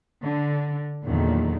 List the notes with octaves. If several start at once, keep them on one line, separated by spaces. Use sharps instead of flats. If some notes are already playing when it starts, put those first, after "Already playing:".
D3
E2 A#2 D3 D#3 F#3